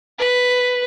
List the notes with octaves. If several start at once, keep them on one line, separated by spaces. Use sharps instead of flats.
B4